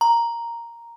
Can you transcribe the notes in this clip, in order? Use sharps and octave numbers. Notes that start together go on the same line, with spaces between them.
A#5